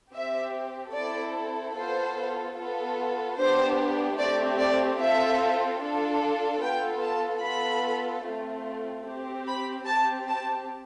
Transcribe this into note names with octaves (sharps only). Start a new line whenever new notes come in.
C4 G4 E5
C4 E4 A4 D5
B3 F4 A4 C5
B3 F4 A4
B3 D4 G4 C5
A3 C4 G4 D5
D5
C4 F4 A4 E5
D4 F4 A4
B3 F4 A4 G5
A5
B3 F4 A4 B5
A3 C4 F4
C4 G4
B5
C4 G4 A5
A5